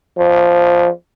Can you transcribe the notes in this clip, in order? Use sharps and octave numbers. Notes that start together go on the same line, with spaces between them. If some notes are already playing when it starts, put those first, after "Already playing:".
F3